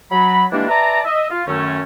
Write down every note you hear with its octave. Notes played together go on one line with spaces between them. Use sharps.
F#3 B5
E3 G3 G#3 A#3 D4
B4 D5 E5 A5 A#5
D#5 E5
F4
F#2 D#3 A3 C#4